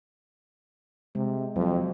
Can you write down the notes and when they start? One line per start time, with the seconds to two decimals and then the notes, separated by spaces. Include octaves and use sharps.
1.15 C3 G#3
1.56 F2 F#3